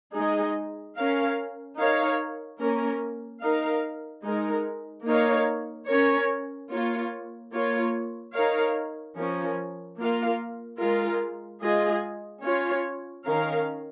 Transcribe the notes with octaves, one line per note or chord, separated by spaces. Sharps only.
G#3 D#4 G#4 D#5
C#4 A#4 F5
D#4 A#4 C#5 F5
A#3 C#4 A#4
D#4 A#4 F5
G#3 D#4 A#4
A#3 D#4 A#4 C#5 F5
C#4 A#4 C#5
A#3 F4 C#5
A#3 F4 C#5
D#4 A#4 C#5 F5
F3 C#4 A#4
A#3 F4 A#4 F5
G#3 F4 A#4 F5
G#3 F4 G#4 D#5
C#4 F4 C#5
D#3 C#4 A#4 F5